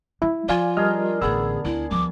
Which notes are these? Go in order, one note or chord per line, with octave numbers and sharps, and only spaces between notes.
G3 E4
F3 F4 D5 F5 G#5
G3 D4 G#4 A#4 D#5 F6
A1 D3 B3 G#4 E6
D2 D4 E4
F3 G3 D6